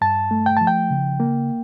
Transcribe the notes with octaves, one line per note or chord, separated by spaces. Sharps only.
G2 A5
A3
G5
F3 A5
G5
C#3
A#3